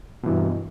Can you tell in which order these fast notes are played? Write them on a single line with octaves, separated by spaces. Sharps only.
B2 E3 G2